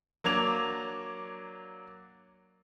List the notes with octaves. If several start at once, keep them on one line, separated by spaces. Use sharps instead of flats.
F#3 A#3 D4 G#6 F7